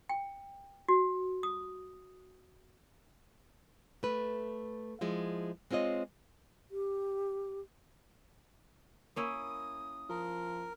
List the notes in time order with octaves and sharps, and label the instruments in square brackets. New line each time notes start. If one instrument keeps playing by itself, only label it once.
[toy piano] G5
F#4
D#6
[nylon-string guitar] A3 B4
F3 G#3 E4
G#3 C4 F4 C#5 D#5
[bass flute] G4
[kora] A#3 C#4 E4 [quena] D#6
[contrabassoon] F3 [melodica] A#4